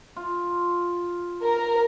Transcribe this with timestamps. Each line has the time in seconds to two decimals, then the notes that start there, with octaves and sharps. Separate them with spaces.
0.16 F4
1.43 A#4